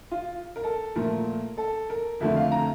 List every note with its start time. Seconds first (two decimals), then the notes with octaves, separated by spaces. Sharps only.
0.11 F4
0.56 A#4
0.64 A4
0.96 A#2 F3 A3 A#4
1.58 A4
1.90 A#4
2.20 F2 D3 F3 A3 E5
2.36 F5
2.52 A#5